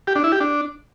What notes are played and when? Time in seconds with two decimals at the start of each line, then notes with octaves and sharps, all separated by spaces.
0.07 G4
0.16 D4
0.24 E4
0.32 G4
0.40 D4